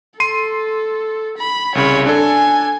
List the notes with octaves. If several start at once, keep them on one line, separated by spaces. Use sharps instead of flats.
A4 C6 C7 D#7
B5
C2 C#3 C#5 B5
D4 A4 G#5